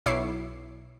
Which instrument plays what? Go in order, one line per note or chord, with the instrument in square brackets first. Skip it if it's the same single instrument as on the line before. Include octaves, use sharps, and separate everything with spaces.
[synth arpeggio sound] B1 E4 C#5 D6 C7